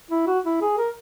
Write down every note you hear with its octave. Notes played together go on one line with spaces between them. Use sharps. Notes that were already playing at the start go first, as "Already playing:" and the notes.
E4
F#4
E4
G#4
A#4